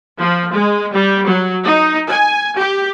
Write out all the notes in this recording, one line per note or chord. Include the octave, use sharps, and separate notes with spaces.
F3
G#3
G3
F#3
D#4
G#5
G4